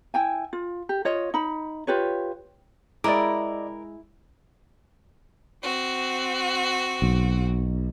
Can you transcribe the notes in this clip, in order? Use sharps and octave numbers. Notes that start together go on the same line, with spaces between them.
E4 G5 G#5
F4
G4
F4 C#5 D#5
D#4 B5
F4 G4 B4 C#5
G#3 E4 A#4 D5 D#5 D6
C4 F#4
B1